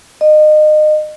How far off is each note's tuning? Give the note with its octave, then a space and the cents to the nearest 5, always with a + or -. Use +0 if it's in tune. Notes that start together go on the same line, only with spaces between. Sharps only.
D#5 -30